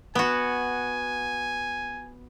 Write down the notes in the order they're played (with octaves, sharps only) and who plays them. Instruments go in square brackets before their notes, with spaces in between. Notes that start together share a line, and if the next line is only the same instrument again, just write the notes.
[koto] B3 F#4 [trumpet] G#5